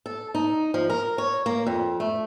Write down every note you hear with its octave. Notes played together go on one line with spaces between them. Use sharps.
A4
D#4
F3
A#4
C#5
A#3
F2
A3